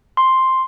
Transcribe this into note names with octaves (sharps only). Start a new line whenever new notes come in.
C6